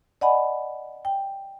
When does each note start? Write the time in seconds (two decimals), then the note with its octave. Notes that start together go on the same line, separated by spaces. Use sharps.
0.21 D5 D#5 F#5 G#5 B5
1.05 G5